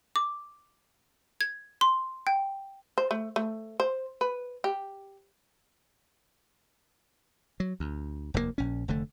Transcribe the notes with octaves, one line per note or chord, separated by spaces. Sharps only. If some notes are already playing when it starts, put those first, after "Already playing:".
D6
G#6
C6
G5
C5
A3
A3
C5
B4
G4
F#3
D2
F1 D#2 A2 A#3
A#1 C#4
F1 D3 A3